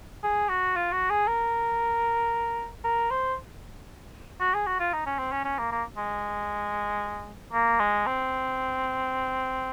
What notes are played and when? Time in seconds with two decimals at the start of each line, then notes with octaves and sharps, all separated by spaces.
0.24 G#4
0.49 F#4
0.76 F4
0.92 F#4
1.10 G#4
1.27 A#4
2.84 A#4
3.11 C5
4.40 F#4
4.54 G#4
4.67 F#4
4.80 F4
4.93 D#4
5.06 C#4
5.18 C4
5.32 C#4
5.45 C#4
5.59 A#3
5.72 A#3
5.97 G#3
7.53 A#3
7.80 G#3
8.06 C4